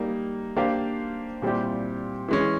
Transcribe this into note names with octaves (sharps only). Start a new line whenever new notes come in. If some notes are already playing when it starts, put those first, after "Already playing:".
Already playing: G3 A#3 D#4
A#3 D4 G4 C5 F5
A#2 G3 C4 E4 G4
E3 G#3 C#4